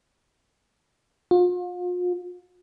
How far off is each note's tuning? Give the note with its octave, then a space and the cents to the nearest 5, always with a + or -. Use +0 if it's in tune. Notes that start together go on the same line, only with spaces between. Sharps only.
F4 +40